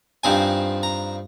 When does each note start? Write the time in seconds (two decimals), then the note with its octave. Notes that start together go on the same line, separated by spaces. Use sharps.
0.23 G2 F3 C4 D#4 G#5
0.83 A#5